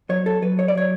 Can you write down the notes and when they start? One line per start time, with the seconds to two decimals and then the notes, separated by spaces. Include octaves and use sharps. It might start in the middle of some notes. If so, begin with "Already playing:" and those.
0.09 F#3 C#5
0.26 A4
0.42 F#3 B4
0.59 C#5
0.68 D5
0.75 F#3 C#5